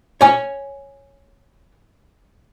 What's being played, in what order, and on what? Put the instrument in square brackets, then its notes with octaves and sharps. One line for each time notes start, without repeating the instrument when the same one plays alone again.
[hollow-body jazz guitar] C#5 G#5